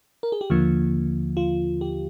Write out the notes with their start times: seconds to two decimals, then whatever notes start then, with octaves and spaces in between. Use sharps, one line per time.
0.23 A#4
0.32 G#4
0.41 G4
0.50 D#2 D3 F3 A#3 F4
1.37 F4
1.81 G4